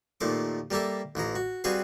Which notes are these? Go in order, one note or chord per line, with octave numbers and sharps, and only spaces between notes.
D#2 A#2 F3 A3 D6
G3 A#3 G4 A4 E5
A1 E3 F3 A#5
F#4
G3 C4 F#4 G#4 B4 F5